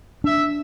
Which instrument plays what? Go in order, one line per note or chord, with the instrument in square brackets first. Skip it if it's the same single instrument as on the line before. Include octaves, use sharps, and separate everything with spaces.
[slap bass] D4 [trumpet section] E5